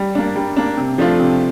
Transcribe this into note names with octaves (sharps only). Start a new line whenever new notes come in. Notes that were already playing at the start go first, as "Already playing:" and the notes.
Already playing: G3
A#3 D4
G3
A#3 D4
C3
F3 A3 D4 F4
C3